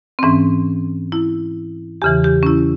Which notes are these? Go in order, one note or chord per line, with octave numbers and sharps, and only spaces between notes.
C4
G#2 E3 C#4
E4
E2 C#3 E3 G4
G4
C#4
E4